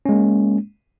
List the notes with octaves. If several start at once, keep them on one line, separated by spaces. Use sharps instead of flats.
G#3 A#3 C#4